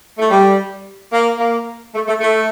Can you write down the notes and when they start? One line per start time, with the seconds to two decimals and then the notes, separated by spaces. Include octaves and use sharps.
0.19 A3
0.30 G3
1.12 A#3
1.38 A#3
1.94 A3
2.07 A3
2.20 A3